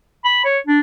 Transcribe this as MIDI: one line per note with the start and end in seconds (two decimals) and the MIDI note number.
0.25 0.42 83
0.45 0.59 73
0.67 0.80 62